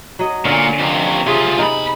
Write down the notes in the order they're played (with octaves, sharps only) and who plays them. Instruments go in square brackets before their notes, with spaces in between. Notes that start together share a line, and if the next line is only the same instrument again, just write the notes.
[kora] F#3 D#5
[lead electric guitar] A#2 [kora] D3 C#4 F5
[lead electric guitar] F2 C3
[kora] C#5
[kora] C3 G#4 [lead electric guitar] F#3 F4
[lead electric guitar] B1 B5 [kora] D#4